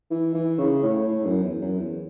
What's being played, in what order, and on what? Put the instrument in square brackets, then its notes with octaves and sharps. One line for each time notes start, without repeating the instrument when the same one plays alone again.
[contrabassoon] E3
E3
C#3
A2
A2
F#2
E2
F#2
E2